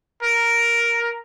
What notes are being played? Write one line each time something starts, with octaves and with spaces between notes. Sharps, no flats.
A#4